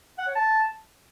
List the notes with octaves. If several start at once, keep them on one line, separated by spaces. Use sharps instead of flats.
F#5
C#5
A5